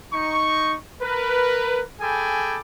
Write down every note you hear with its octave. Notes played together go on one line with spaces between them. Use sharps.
D#4 C#6
A#4 B4
G#4 A4 G5 G#5 B5 D6